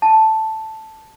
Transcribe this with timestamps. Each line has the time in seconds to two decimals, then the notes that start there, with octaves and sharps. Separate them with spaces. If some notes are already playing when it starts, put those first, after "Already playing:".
0.02 A5